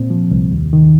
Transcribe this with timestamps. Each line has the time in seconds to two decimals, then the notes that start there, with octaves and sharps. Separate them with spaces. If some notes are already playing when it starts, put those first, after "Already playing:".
Already playing: A#2 C4
0.10 F3
0.31 C2
0.52 D#2
0.73 D#3